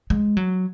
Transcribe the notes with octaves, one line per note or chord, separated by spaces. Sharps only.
G#3
F#3